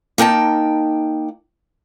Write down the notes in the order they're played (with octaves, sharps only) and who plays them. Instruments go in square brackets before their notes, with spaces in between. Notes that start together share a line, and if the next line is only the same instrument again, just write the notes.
[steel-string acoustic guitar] A#3 D#4 G5 A5